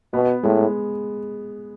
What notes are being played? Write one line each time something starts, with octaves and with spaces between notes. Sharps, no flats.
B2 B3
A2 G#3